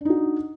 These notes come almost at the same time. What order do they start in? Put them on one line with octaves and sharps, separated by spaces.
D4 D#4 F#4